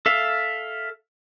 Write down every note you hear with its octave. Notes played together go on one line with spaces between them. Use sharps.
A4 E5 F5